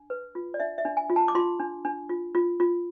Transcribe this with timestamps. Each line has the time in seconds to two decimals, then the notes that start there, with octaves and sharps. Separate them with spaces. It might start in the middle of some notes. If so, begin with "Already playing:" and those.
Already playing: D4
0.10 B4
0.35 F4
0.54 D5
0.60 D4 E5
0.78 E5
0.85 D4
0.97 G#5
1.10 F4
1.16 A5
1.28 D6
1.35 F4 C6
1.60 D4
1.85 D4
2.09 F4
2.35 F4
2.60 F4